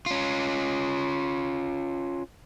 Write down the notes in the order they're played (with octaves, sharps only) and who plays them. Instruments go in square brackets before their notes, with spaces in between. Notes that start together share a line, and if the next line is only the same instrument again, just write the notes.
[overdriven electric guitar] C#4 F4